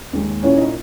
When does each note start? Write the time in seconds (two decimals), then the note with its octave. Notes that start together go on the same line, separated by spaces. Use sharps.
0.13 D#2 D#3 G#3
0.43 A#2 A#3 C#4 E4 C#5
0.58 D#4 D#5